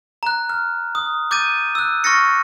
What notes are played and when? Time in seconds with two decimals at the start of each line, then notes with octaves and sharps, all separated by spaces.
0.23 A#5 F#6
0.50 F6
0.95 D#6
1.31 D6 G6 A6 D#7
1.75 E6 F#6
2.04 C#6 F6 A6 A#6 C#7